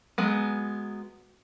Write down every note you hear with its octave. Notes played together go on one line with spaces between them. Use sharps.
F#3 G#3 B3